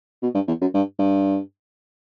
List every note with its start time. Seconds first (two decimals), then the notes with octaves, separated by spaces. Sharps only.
0.23 B2
0.35 G2
0.48 E2
0.61 F#2
0.74 G2
0.99 G2